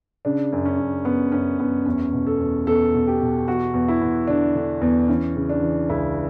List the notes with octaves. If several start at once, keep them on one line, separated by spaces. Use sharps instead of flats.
C#3 D4
F#2
C#4
F#2
F#2 B3
F#2 C#4
F#2 B3
E2 C#4
B2
A4
E2
E2 A4
B2
G4
B2
E2 F#4
E2
E4
E2
D3 D4
D3
E2
E3 C#4
C#3
D4
E3
C#2 E4